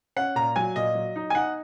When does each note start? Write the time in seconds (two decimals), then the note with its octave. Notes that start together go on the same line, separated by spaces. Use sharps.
0.16 C#4 F#5
0.35 A#2 A#5
0.56 F#3 G#5
0.76 A#2 D#5
0.95 F#3
1.16 D#4
1.30 G#5
1.35 D#4 F#5